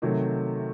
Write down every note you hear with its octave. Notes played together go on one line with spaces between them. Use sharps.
C3 D#3 F#3 A3